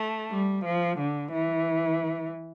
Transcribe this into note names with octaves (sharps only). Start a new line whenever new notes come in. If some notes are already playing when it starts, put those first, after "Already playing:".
Already playing: A3
G3
F3
D3
E3